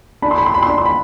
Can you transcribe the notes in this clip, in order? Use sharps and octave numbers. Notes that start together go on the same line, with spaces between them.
D4 B5
C6
B5
C6
B5
C6
D4 B5
C6
B5